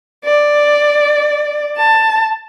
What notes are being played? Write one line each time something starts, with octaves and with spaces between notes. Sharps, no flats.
D5
A5